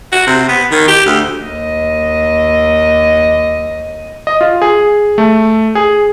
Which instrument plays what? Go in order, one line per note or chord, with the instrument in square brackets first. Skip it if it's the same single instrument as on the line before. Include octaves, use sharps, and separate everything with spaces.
[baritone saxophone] F#4
C3
B3
D#3
G4
D2
[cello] D#2 D#5
[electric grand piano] D#5
F4
G#4
A3
G#4